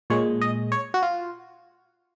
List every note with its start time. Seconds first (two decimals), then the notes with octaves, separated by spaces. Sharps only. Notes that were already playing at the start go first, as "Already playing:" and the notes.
0.10 A#2 G#3 C#5
0.41 D#5
0.72 C#5
0.94 F#4
1.03 F4